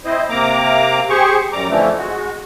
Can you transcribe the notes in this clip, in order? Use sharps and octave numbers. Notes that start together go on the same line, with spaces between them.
C4 E4 C5 D#5
C3 A#3 A#5 D6
G4 G#4 C5 C#6
F#2 G3 A#5 D6
F2 D3 E3 F3 A3
G#3 F#4